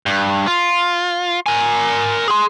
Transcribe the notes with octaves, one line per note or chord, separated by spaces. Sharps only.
G2
F4
A#4 G#5
G#4 C6